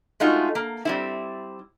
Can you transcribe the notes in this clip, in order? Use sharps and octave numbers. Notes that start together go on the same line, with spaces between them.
G#3 A3 D#4 F4 F#4
A#3
G3 C4 E4